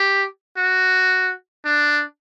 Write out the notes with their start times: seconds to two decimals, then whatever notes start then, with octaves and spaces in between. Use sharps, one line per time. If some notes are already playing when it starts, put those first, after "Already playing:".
Already playing: G4
0.57 F#4
1.65 D4